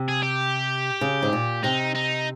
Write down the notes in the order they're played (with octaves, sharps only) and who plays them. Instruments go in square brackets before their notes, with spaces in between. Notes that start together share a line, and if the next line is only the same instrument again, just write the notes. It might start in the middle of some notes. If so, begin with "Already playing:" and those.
Already playing: [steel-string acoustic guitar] C3
[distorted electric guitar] G#4
G4
[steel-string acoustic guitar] C#3
G#2
A#2
[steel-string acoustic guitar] C3 [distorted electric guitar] D#4
[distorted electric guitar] D#4